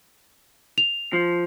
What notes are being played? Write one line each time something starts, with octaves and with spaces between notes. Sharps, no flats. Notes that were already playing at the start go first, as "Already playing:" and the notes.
F7
F3